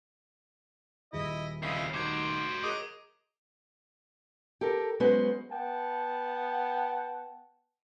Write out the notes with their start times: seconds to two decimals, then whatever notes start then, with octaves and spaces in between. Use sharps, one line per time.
1.13 D#1 E4 G#4 D#5
1.63 C2 C#3 E4 F4 D#5 C7
1.94 D#3 F#4 C5 D6 G#6 D7
2.15 D7
2.64 G#4 A#4 D#5 D6 D#6 D#7
4.61 G4 A4 A#4
5.00 F#3 G#3 B3 C#4 B4 C5
5.52 B3 F#5 G5 A5